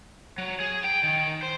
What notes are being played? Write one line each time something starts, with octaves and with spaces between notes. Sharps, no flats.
F#3
G#4
G5
D#3
C5